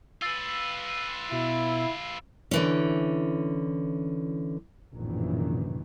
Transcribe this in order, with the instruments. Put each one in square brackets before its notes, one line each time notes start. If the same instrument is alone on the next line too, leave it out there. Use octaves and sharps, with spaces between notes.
[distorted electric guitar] F4 B4 [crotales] E6 A6
[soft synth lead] B2 [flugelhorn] E4
[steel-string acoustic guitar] D3 E3 C#4
[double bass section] A#1 F#2 A2 C3 D#3 E3